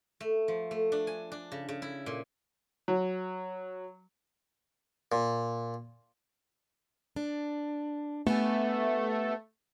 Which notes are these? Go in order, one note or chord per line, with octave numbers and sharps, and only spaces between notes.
A3
F3
A3
D4
G#5
D4
C#3
C#3
E4
A#2
F#3
A#2
D4
A3 B3 G4 G#5